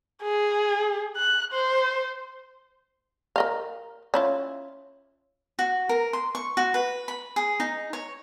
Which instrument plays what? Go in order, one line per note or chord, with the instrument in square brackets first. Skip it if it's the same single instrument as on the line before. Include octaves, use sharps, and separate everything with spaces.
[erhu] G#4
F#6
C5
[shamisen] A#4 D#5 F5
C#4 E4 F4
[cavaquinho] F#4
A#4
C6
C#6
F#4
B4
B5
G#4
D#4
C#5